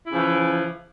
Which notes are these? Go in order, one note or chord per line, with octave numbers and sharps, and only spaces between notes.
C#3 E3 F3 E4